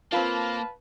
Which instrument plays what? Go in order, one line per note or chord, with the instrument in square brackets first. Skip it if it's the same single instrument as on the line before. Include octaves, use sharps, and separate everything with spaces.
[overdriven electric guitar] A#3 [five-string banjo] C4 F4 [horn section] B4 F5 A5